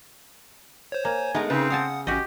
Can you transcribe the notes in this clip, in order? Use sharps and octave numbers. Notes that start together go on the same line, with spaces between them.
C5 C#5
A#3 G#5
G#3 A3 B3 D#4 A#4
C#3 C4 D#4 G#4 B4
F5 F#5 G#5 A5 D#6
A1 C#4 F#4 G4 D#5